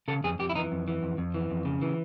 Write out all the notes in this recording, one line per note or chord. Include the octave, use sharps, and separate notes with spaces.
C#3 A4
F2 G#4
F2 G4
E4
E3 D#4
F2
E3
F2
F2
E3
F2
C#3
E3